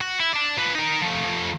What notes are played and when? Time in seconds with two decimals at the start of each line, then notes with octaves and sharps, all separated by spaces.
0.01 F#4
0.20 E4
0.33 D5 A5
0.58 F3 B4
0.75 D#4 A#4
1.02 F3 A3